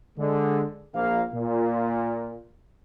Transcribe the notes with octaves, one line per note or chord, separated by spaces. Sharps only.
D3 G#3
A#1 A#3 F5
A#2